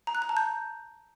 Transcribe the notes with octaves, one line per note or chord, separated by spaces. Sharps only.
A#5
F#6
A#5
A5
G6